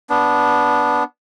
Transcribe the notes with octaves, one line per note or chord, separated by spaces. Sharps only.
B3 D4